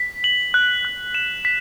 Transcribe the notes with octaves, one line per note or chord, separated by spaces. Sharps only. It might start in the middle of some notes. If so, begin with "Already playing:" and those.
Already playing: B6
F#7
F#6
F#6
E7
B6